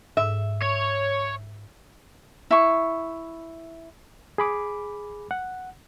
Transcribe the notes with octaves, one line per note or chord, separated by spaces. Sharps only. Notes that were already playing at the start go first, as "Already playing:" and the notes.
G#2 E5
C#5
E4 C#6
G#4 B5 D6
F#5